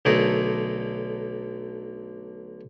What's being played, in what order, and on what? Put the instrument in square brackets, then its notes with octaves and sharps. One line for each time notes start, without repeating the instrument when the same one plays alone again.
[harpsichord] B1 D3 A3 G#4 A#4